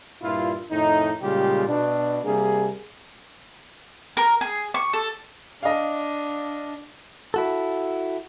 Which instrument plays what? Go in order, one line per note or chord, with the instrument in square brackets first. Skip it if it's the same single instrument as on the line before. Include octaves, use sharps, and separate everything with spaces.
[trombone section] G2 A#2 E4 F4
F2 A2 D#3 D#4
A#2 C#3 G3 G#3 F4 G4
B2 D4
C3 G3 A#3 G#4
[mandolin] A#4
G#4
C#6
A4
[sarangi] D4 [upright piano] D#5 F5
[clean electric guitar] E4 F#4 A4